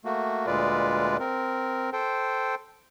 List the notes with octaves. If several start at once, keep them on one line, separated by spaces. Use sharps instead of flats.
A3 A#3 F#4
D2 A#2 G#3 F4 B4 D5
C4 A#4
A4 C5 G5